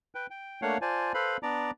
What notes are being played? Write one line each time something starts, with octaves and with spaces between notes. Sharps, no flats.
B4 G5
G5
A3 A#3 D4 C#5 F5 F#5
F4 C5 D5 G#5 A5
A4 B4 C5 F5 B5
B3 D4 D5 A#5 D6